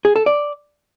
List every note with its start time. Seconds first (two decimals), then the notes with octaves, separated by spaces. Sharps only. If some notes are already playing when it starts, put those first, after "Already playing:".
0.05 G#4
0.16 A4
0.26 D5